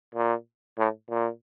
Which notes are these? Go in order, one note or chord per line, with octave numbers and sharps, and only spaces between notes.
A#2
A2
A#2